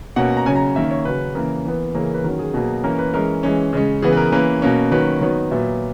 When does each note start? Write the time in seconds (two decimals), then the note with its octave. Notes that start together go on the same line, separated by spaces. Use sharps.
0.16 B2 A#3 C#4 F#5
0.37 A#5
0.46 C#3 F#3 C#4 G#5
0.56 A#5
0.76 D#3 A#3 C#4 E5
0.91 C#5
1.05 C#3 F#3 C#4 B4
1.35 C#3 E3 A#3 A#4
1.65 E3 B3
1.95 C#3 E3 A#3 C#4 G#4
2.04 A#4
2.14 B4
2.24 D#3 F#3 C#4 A#4
2.39 G#4
2.54 B2 F#3 A#3 G#4
2.84 E3 A#3 C#4 A#4
2.99 B4
3.13 E3 G#3 C#4 A#4
3.43 E3 G#3 C#4
3.73 C#3 G#3 C#4
4.02 C#3 E3 B3 G#4
4.12 B4
4.17 A#4
4.32 E3 A#3 C#4 B4
4.62 B2 A#3 C#4
4.91 D#3 F#3 A#3 C#4 B4
5.21 D#3 F#3 B3 C#5
5.51 A#2 F#3 B3 E5